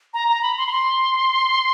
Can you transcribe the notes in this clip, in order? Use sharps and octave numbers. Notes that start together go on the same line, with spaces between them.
A#5
A#5
B5
C6
B5
C6